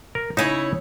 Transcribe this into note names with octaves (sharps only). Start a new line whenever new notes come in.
A#4
C#3 D#4 E4 C#5 E5 G#5